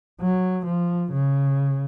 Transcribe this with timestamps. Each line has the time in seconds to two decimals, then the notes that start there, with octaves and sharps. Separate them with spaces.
0.21 F#3
0.66 F3
1.12 C#3